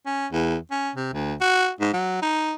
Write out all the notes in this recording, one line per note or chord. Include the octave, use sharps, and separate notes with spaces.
C#4
E2
C#4
C3
D2
F#4
G#2
F#3
D#4